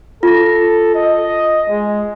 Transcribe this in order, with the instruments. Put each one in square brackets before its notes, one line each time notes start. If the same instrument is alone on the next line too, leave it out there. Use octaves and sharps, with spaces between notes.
[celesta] F4 A#6 [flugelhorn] A4
[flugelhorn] D#5
G#3